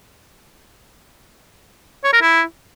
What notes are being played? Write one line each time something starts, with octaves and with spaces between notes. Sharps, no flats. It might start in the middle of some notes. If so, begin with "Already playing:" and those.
C#5
A#4
E4